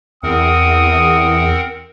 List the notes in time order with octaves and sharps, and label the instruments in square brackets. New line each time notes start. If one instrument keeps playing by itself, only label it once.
[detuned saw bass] E2 [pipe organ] C4 A#4 F#5 [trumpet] D#6